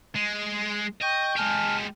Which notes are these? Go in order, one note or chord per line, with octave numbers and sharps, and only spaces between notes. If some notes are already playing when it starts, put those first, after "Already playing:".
G#3
D#5 G5 C#6 G6
G#3 G4 G#5 A5 F6